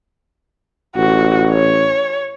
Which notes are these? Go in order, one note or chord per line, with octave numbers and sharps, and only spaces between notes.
A1 F#4
C#5